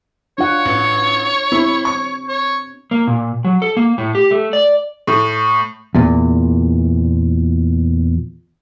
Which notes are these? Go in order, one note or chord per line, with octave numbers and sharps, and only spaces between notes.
D4 F4 C#5 F#5
A1 C#7
C4 E4 B5
C#6
C#5
A#3
A#2
F#3
A4
A#3
A2
G4
A3
D5
A2
E2 A#2